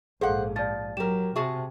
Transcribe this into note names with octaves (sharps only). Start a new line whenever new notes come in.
A#1 G#2 G#4 A4 C5 F5 F#5
F3 D5 A6
F#3 G4 A#4 E7
C3 F#4 G#4 E5 A5